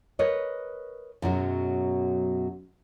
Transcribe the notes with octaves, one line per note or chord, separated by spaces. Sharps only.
A#4 B4 C#5 D#5
F#2 B2 F#3 G#3